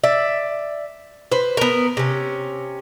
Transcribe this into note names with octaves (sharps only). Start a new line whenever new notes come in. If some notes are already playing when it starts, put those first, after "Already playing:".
D5 E5
B4 C5
B3 A#4
C3 C#4